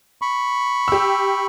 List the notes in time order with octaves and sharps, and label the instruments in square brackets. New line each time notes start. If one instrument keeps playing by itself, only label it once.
[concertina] B5 C#6
[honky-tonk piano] G4 E6